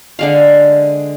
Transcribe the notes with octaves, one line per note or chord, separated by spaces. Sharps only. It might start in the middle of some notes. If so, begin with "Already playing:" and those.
D3 G#3 F5